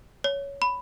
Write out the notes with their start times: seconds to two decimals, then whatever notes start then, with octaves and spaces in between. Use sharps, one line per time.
0.24 C#5
0.62 B5